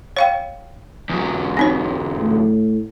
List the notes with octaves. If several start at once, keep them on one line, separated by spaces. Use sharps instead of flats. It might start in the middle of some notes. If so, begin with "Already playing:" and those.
C#5 F5 G5
E2 F#3
C4 D#4 C#5
A2